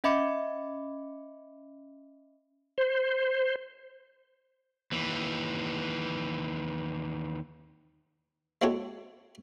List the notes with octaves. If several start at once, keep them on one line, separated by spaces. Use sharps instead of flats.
C#4 D#5 E5 B5 D6 C#7
C5
D#2 E3
G#3 C4 E4 F#4 A4 C#5